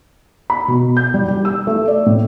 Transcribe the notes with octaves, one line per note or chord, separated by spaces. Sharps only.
B5
B2
G6
G3
G4
E6
A3
D5
A2